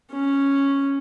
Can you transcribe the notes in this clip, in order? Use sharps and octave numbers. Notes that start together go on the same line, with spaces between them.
C#4